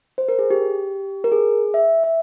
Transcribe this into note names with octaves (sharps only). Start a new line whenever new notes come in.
C5
A#4
G#4
G4
A#4
G#4
E5
E5